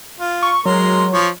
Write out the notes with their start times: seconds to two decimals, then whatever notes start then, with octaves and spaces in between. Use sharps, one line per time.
0.20 F4
0.43 C#6
0.66 F#3 G#3 A#4 C6
1.13 F3 C#5